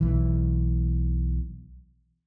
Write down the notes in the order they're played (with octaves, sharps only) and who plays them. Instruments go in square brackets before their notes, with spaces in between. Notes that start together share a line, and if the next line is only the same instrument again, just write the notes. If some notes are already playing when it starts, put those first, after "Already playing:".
[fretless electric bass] B1 E3